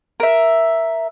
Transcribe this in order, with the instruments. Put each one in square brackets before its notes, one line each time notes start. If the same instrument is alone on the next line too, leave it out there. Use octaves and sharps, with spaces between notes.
[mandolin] A#4 E5